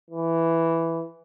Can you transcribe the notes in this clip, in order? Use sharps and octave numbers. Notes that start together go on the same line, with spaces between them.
E3